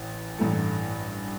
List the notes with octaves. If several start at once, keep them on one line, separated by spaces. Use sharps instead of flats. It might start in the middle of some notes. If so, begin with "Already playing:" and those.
Already playing: A1 E3
A1 G2 E3 A3